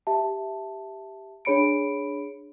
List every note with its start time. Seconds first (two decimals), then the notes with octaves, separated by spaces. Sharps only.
0.07 G4 E5 A5
1.45 D4 G#4 C#5 B5 C#7 D7